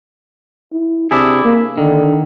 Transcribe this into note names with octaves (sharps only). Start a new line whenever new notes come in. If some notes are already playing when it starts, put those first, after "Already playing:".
E4
C3 D4 E4 G#4
A#3
D3 D#3